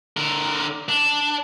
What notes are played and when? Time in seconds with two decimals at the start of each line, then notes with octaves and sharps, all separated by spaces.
0.17 D3 A#4
0.89 D4